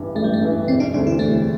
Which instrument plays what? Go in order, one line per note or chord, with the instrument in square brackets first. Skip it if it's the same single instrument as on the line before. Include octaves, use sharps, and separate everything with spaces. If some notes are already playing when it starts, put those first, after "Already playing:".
Already playing: [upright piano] A1 G2 E3
[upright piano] A1 [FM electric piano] A3
[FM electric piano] G3
A3
[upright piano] G2 E3
[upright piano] E1 [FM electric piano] C4
[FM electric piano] D4
[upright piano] D2 D3 G3 C4 [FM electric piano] D4
[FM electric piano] E4
[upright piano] E1 [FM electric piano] A3